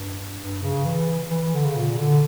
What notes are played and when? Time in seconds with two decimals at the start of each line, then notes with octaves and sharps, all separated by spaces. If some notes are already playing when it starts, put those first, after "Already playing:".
Already playing: G2
0.41 G2
0.63 C#3
0.85 E3
1.31 E3
1.54 D3
1.65 C#3
1.76 A#2
1.98 D3